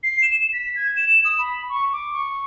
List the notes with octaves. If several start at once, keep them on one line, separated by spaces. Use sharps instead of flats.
C7
E7
B6
G#6
E7
D#6
B5
C#6
D6
C#6